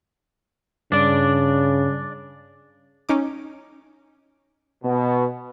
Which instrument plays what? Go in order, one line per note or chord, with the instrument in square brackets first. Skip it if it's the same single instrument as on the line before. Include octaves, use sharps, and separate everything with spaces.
[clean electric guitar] G2 [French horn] C#3 [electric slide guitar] D4 D5
[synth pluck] C#4 D#4 D6
[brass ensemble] B2